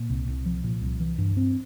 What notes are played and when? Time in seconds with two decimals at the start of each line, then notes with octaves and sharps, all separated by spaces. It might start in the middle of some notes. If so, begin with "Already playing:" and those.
Already playing: A#2
0.09 C2
0.28 C2
0.46 F3
0.64 A#2
0.81 C2
1.00 E3
1.18 G2
1.37 C4